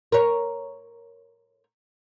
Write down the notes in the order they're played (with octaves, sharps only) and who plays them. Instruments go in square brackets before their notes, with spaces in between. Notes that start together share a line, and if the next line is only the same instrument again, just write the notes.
[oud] A#4 C#5